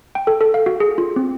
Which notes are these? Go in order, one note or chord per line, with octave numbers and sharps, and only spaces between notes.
G5
A4
A4
F5
F#4
G#4
F4
C4